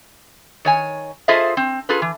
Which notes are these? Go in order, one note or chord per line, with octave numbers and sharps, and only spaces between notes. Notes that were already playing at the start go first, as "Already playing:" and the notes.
D#3 C#5 G#5
F4 G#4 A4 C5 D#5 E5
C4
F4 G#4 A4 B4
E3